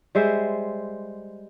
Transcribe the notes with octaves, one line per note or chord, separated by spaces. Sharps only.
G3 G#3 C5 E5